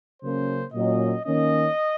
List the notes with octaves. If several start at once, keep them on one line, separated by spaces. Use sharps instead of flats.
C#3 F#3 A#3 C#4 C5
A#2 F#3 C#4 D#5
D#3 A#3 C#4 D#5